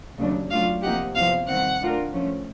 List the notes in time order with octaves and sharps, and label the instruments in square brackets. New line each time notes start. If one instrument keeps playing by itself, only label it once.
[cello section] D#2 C#3 F#3 A3 D4
[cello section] F#3 A3 D4 F4 [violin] F5
[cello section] C3 F3 A#3 D#4 G4 [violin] F#5
[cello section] E2 C3 F3 [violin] F5
[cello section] D#3 G3 C4 [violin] F#5
[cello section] A3 D4 F4 A#4
F3 A3 C#4